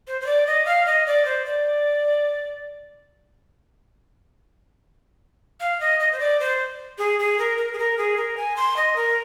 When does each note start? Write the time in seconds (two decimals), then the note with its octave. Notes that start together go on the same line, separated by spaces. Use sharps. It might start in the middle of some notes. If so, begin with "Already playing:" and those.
0.08 C5
0.21 C5
0.26 D5
0.47 D#5
0.66 F5
0.86 D#5
1.06 D5
1.25 C5
1.46 D5
5.60 F5
5.80 D#5
6.00 D#5
6.12 C5
6.20 D5
6.40 C5
6.98 G#4
7.19 G#4
7.39 A#4
7.58 A#4
7.73 G#4
7.79 A#4
7.98 G#4
8.17 A#4
8.37 G#5
8.56 C6
8.76 D#5
8.96 A#4